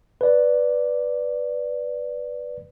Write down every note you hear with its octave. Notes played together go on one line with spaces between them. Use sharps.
B4 D5